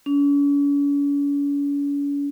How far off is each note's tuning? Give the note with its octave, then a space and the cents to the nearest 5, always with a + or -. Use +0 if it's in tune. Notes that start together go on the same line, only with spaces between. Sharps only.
C#4 +45